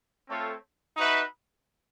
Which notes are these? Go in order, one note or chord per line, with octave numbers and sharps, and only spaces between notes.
A3 C4 F4 A4 C#5
D#4 F#4 B4 E5